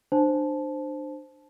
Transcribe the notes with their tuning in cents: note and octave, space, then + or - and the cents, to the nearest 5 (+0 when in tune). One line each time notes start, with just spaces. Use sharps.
D4 +30 C5 +0 A5 -20